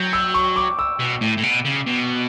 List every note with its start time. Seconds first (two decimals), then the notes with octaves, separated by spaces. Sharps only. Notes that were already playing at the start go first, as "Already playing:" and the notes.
Already playing: F#3 G6
0.13 E6
0.34 C#6
0.56 D6
0.79 E6
0.99 B2
1.21 A2
1.37 A2
1.43 B2
1.65 C#3
1.87 B2